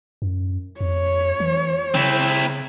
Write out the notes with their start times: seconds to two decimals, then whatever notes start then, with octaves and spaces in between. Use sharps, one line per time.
0.22 F#2
0.81 F2 C#5
1.40 E3
1.94 C#3 C4 E4